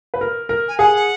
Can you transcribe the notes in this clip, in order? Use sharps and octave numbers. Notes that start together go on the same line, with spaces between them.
B4
A#4
A#4
G#5
G#4 F#5